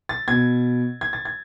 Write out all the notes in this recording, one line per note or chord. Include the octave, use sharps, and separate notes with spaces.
A6
B2 G#6
G#6
A6
G#6